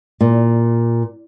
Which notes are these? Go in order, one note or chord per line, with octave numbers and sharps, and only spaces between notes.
A#2